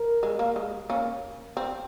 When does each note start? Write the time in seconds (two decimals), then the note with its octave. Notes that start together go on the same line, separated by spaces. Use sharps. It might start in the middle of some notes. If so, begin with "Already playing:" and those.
Already playing: A#4
0.23 G#3
0.39 A#3
0.56 G#3
0.90 A#3 C#4
1.57 C4